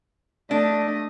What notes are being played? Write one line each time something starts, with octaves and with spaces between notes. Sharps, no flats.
A3 D4 D#5